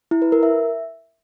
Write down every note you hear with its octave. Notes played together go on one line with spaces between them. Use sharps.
E4
B4
A#4
E5